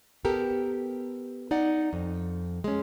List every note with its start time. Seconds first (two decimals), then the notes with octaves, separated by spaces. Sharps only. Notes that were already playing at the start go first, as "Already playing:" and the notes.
0.25 B3 G4 A4 A#4
1.51 D#4 D5 F#5
1.93 F2
2.64 G#3 C#4